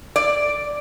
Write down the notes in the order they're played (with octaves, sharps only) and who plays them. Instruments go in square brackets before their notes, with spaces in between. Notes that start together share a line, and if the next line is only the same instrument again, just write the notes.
[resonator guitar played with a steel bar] D5